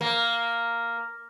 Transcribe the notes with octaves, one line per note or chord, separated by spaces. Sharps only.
A#3